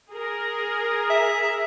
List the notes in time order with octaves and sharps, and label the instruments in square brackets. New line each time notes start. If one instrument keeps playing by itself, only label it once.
[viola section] G#4 A#4
[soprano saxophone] E5